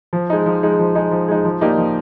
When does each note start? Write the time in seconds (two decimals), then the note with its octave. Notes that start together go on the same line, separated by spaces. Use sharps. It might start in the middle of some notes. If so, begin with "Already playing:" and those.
0.13 F3
0.30 G#3 D#4
0.46 F3
0.63 G#3 D#4
0.79 F3
0.95 G#3 D#4
1.11 F3
1.28 G#3 D#4
1.45 F3
1.61 A#3 D#4 G4 D5
1.77 F3